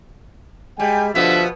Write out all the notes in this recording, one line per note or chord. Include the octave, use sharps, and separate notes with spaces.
G3 G#3 G5 G#5
B2 D3 F3 B3 E5